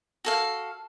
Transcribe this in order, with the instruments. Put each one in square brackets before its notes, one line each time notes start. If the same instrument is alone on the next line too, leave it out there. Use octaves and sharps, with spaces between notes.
[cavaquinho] F#4 A4 F5